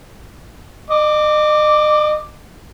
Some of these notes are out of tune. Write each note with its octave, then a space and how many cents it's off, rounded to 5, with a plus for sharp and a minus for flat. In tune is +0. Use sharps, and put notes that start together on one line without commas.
D#5 -40 D6 +0